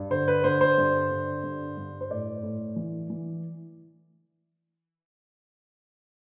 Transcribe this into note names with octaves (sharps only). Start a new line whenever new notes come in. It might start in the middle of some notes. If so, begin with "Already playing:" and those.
Already playing: G2
D3 C5
B4
D3 C5
C5
G2
D3
G2
G2
C5
A2 D5
A2
E3
E3